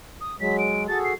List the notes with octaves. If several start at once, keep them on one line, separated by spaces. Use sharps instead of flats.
D#6
F#3 G#3 B6
D7
F#4 G#4 A4 A6
C7